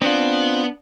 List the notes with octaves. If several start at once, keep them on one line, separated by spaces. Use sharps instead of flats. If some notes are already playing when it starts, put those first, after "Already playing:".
B3 C4 D4 F4 F#5